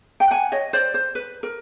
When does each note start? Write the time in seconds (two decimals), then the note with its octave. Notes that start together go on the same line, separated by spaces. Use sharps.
0.20 G5
0.31 F#5 G#5
0.52 C#5 D#5
0.73 C5 D5
0.94 C5
1.15 B4
1.43 A#4